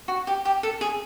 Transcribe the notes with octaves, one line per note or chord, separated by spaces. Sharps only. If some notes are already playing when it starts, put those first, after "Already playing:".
F#4
G4
G4
A4
G#4